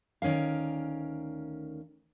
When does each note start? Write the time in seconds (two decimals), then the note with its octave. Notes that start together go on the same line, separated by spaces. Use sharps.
0.22 D2 D#3 C#4 A#4 F5